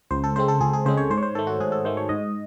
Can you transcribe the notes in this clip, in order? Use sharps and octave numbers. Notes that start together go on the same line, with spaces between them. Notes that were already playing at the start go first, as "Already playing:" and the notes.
C#2 C5
A4
C#3 G#3 C4 C5
A4
C#2 G#4
G#4
C#3 G#3 C4 C5
C#5
G#2 C5
C#5
C5
D#3 A3 A4
F#4
G#2 G#4
A4
D#3 A3 C5
C#5
G#2 D#5